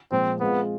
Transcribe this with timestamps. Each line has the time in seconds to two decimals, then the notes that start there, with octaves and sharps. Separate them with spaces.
0.11 A#2 F3 G#3 C4
0.40 G#3 B3 C4 F4 G#4